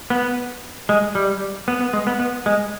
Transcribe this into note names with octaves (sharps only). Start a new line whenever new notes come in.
B3
G#3
G3
B3
B3
G#3
B3
B3
G#3